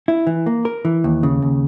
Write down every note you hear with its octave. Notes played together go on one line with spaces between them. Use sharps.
E4
E3
A#3
A#4
E3
D#2
C#3
D#2